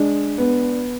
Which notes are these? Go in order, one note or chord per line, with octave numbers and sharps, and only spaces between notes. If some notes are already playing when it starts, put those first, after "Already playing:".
Already playing: G#3 D4
B3